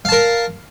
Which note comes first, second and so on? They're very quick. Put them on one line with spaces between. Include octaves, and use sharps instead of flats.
F5 A5 A#4